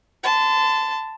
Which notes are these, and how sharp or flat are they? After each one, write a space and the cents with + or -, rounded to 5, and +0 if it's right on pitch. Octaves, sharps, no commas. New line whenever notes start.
A5 +0 C6 -35